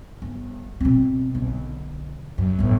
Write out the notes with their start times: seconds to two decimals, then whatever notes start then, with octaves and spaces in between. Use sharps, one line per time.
0.22 G1
0.81 B2 C4
1.35 B1 D3
2.38 F#2
2.59 G1 A2